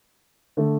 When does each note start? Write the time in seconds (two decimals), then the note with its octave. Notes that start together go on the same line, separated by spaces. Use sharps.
0.57 D3 A3